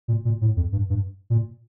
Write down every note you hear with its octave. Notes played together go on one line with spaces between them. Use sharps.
A#2
A#2
A2
F2
G2
G2
A#2